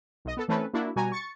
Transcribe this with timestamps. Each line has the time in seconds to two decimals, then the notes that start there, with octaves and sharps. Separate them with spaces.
0.25 B1 D#5
0.37 B3 A4
0.48 E3 A3 C4 C#4 A4 B4
0.74 A#3 D4 E4 F#4
0.96 B2 G3 F#4 G#5 A#5
1.12 C#6 A6 C#7